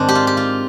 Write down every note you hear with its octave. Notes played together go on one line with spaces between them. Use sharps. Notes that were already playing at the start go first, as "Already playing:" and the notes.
Already playing: G#2 D#3 C4 D4
G4
F4
G4
F4